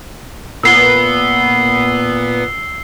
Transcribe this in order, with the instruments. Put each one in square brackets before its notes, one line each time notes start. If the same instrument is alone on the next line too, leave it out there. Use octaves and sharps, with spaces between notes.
[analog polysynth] A#2 B3 [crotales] E6 C7 G7